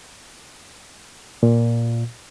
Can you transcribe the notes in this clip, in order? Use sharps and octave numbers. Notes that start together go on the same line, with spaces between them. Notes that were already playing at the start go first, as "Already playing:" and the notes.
A#2